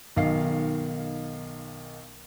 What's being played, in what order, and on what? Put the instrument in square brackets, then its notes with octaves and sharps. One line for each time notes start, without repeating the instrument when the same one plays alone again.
[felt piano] B1 D#3 F5 C7